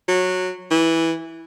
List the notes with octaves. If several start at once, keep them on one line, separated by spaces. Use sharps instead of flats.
F#3
E3